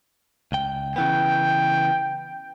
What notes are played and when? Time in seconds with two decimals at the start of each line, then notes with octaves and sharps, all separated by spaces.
0.52 C#2 G5
0.96 C#3 E3 B3 G5